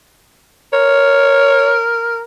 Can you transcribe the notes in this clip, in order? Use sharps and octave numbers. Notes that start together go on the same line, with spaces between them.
A#4 C#5